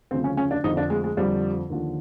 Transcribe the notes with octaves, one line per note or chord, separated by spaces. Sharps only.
D2 C#3 F3 C4
C#4
C#4
D4
F2 D3 F3 D#4
D4
G#3
G#3
F2 D3 F3 G3
D#2 D3 F3